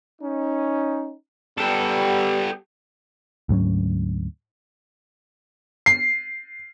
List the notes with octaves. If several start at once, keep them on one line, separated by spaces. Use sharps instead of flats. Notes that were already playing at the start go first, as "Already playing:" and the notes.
C#4 D#4
G3 B3 G4 A4
D2 G#2 F#3 C#4
C7